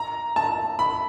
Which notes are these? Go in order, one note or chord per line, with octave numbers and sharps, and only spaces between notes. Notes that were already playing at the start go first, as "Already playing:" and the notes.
Already playing: A#5
A5
B5